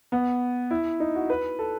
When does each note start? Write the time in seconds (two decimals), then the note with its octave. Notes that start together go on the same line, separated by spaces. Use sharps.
0.12 B3
0.71 E4
1.00 D#4
1.15 F#4
1.30 B4
1.59 A4